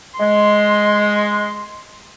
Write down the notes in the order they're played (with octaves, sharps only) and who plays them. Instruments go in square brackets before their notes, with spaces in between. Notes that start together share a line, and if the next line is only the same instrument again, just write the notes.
[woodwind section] G#3 [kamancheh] C6